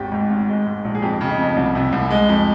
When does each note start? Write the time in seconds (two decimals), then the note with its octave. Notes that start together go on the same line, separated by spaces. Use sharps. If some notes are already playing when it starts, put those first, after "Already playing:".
Already playing: G#1 D#2 G4
0.12 G#2
0.30 G#1
0.49 G#3
0.66 G#2
0.85 A#1
0.95 G#4
1.02 F2 G4
1.21 C#3
1.30 D#4
1.39 F2
1.56 C2
1.75 C3
1.92 C2
2.10 G#3
2.29 F2